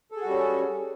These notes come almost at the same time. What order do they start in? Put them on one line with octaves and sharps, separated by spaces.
A4 G#4 F#4 G3 C#4